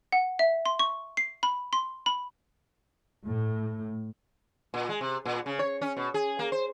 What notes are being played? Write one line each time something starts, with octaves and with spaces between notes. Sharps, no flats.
F#5
E5
C6
C#6
C7
B5
C6
B5
A2
A#2
G#3
C3
A#2
C#3
C#5
C#4
B2
G#4
A#3
C5